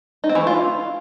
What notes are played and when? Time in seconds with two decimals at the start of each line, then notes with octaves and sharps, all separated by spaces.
0.24 D#4
0.29 C4
0.35 E3
0.41 A3
0.47 F4